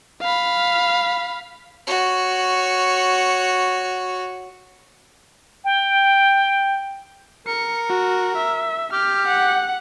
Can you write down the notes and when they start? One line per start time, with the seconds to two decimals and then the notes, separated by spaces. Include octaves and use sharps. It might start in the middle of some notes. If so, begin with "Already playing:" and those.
0.22 F5 B5
1.87 F#4 C#5
5.64 G5
7.47 A#4 C#7
7.90 F#4
8.37 E5
8.93 G4 F6
9.28 F#5